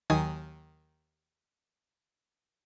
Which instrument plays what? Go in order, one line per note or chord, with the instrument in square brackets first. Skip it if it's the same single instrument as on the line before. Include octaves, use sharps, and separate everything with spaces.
[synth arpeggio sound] D#2 D#3 F#3 G#5 D#6